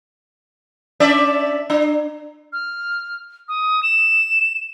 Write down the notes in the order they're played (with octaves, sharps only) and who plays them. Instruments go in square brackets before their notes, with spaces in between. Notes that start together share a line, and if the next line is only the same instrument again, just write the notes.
[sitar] C#4 D5 E5
D4
[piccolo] F6
D#6
E7